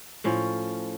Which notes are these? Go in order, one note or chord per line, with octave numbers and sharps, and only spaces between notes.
A2 F3 C#4